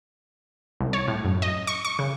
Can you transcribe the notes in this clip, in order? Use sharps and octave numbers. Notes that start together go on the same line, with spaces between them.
C2
C#5
A2
F#2
D#5
C#6
C#6
C#3